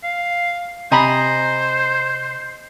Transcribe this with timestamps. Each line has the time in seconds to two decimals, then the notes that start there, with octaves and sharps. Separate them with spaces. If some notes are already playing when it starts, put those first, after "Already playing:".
0.04 F5
0.92 C3 C5 D#5 G#5 A#5 B5